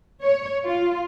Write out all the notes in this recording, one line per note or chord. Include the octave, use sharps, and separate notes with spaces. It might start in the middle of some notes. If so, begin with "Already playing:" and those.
C#5
F4